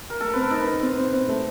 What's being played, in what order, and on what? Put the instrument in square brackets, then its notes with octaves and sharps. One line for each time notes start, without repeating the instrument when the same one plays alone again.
[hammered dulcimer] A#4
[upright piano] A3 [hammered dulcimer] A4
[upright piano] C4 [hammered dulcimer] B4
[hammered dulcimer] A#4
[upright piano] D#4
[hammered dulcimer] B4
[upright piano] D#4
C4
C4
C4
A3